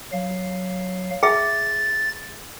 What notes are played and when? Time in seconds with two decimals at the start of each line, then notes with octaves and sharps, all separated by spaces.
0.12 F#3 F5
1.23 G#4 E5 A6